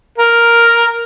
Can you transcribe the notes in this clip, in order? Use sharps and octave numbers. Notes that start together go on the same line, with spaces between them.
A#4